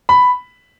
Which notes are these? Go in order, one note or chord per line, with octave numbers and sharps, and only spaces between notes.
B5